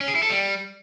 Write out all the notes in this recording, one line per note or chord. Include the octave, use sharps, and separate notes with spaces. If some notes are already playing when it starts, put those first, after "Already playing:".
C#4
G#4
E4
A4
G3